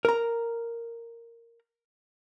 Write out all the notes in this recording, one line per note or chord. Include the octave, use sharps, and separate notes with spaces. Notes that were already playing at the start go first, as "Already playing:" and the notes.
A#4 A#5